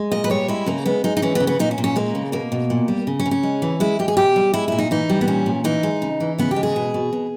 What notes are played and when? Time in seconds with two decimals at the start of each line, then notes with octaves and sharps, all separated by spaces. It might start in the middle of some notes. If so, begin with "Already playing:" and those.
Already playing: G#3
0.12 A#2 D#5
0.24 B4
0.30 G3 C#5
0.48 G#3 E4
0.66 C#3 A#3
0.86 G#3 B3
1.04 G#3 D#4
1.17 D#4
1.22 E3 C#4
1.35 B3
1.40 C#3
1.47 B3
1.59 A#2 D#4
1.71 C#4
1.78 A#2
1.84 C#4
1.96 G#3 A#3
2.15 C#3
2.32 B2 A#3
2.52 B2
2.70 A#2
2.88 G3
3.07 C#3
3.19 C#4
3.26 C#3
3.31 C#4
3.43 G#3
3.62 E3
3.80 G#3 E4
3.99 G#3 G4
4.08 G#4
4.17 B2 G4
4.36 G3
4.54 G#3 E4
4.68 A#2 E4
4.78 D#4
4.91 E3 D#4
5.09 G3
5.21 B3
5.27 A#2 C#4
5.46 A#2
5.64 E3 D#4
5.83 G#3
6.02 C#3
6.20 E3
6.38 C#3 B3
6.51 G4
6.56 G#3
6.63 G#4
6.76 B2
6.94 B2
7.13 B2